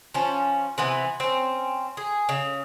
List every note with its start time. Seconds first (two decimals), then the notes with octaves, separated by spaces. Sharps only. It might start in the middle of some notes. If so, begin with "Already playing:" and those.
0.14 F3 C#4
0.78 C3 E3 B3
1.20 C4 C#4
1.97 G#4
2.29 C#3